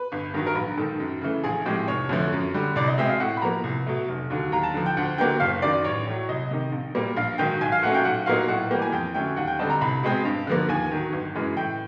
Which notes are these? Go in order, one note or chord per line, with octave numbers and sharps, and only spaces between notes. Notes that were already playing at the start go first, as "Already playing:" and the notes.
Already playing: B4
G1
G2 D#3 F#3
A#4
A#1 B4
G#2 D#3 A4
F#2
C#3 E3 A3
A#1 G#4
A2 F3 G#3 C4 G4
F1 C#5
F2 D3 F3 A3
F#2
D3 G3
C2 D5
D#5
B2 G#3 C4 E5
F5
A2 F#5
B5
F3 A#3 A#5
C2
B2 F#3 A3
F1
D#2 D3 F#3
D#2 A#5
A5
D3 F3
G5
D2 F#5
D3 F#3 A#3 G5
F#1 F5
F#2 D#3 D5
D5
A1 C#5
A2 F#3
C2 D#5
C3 D#3
A#1
A#2 G3 A#3
A#1 F5
G#2 D#3 F#3 G5
B1 G#5
F5
A#2 F#3 A3 C#4 F#5
G5
B1 F#5
A#2 F#3 A#3 D#4 F5
A2 F#5
E3 G3 A#3 G5
G#5
F2 G5
D3 F#3 A3 C#4 G5
D#2 F#5
G5
D3 G3 C4 D#4 A5
A#5
C2 B5
B2 G#3 C4
G2
D3 F3 A#3
D#2 G#5
D#3 F#3
G1
F#2 C#3 E3 G#3
A2 G5